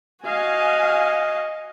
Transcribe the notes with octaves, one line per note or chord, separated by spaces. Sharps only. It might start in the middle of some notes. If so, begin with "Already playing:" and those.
F#4 D#5 F5 G#5